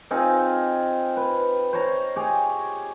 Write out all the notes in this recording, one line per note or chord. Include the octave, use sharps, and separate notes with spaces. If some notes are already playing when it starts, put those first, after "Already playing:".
C4 D#4 F4 G#4
B4
C5 C#5 A#5
G4 G#4 C#5